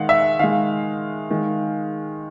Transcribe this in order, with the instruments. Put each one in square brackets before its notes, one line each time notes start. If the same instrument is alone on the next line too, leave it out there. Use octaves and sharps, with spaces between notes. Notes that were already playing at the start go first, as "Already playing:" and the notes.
Already playing: [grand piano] D#3 G#3 F5 F#5
E5
D#3 G#3 F5
D#3 G#3